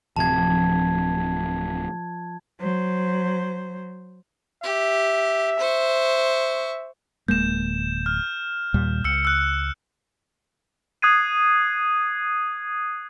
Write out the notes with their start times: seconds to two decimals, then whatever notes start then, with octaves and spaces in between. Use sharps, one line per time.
0.16 D1 C3 F3 A5 G#6
2.60 F#3 C5
4.64 G4 E5
5.59 C5 C#6
7.28 D1 G#3 A#3 G6 E7
8.06 F6
8.74 D#2 A#2 G3
9.04 C#2 E6 C#7
9.25 E6 F#6
11.02 D#6 F#6 G#6 C7 D#7